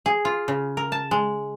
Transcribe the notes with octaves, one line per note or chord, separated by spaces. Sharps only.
G#4
F4
C#3
A#4
A5
G#3